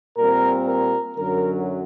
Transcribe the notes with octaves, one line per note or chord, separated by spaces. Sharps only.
A#2 G3 C4 A#4
A#4
F#2 D3 F#3 A#4